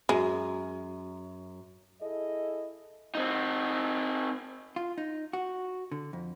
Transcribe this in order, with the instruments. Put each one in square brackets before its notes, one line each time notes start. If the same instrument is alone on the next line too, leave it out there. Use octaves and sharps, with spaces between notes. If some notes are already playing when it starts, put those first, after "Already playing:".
[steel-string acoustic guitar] F#2 [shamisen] G#3
[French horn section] E4 G#4 A4 D#5
[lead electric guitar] C4 D#4
[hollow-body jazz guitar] F4
D#4
F#4
D3
F2